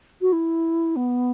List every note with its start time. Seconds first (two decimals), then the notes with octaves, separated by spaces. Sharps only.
0.21 F#4
0.32 E4
0.96 B3